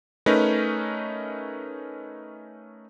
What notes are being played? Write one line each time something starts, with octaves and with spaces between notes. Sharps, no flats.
A3 C#4 D#4 A#4 B4